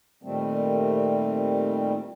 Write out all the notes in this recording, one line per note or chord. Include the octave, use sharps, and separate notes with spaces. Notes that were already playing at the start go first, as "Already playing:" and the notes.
A#2 D#3 G3 A3 C4